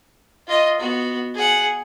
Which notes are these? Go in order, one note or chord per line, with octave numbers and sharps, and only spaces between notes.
F4 D#5
B3 F#4
G#4 F#5